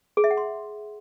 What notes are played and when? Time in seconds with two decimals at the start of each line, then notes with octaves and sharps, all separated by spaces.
0.17 G#4
0.24 E5
0.31 F#5
0.37 C6